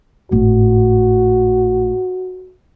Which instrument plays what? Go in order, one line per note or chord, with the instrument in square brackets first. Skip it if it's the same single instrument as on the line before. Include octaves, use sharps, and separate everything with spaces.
[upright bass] G#1 A2 [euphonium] F#4